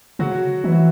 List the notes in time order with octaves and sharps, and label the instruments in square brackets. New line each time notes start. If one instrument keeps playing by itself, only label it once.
[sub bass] C#3 [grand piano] F#3 F#4
[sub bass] E3 [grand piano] E4
[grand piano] F#4